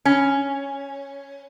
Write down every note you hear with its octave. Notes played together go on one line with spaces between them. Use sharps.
C#4